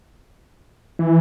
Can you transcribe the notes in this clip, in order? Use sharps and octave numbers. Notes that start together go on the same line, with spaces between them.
E3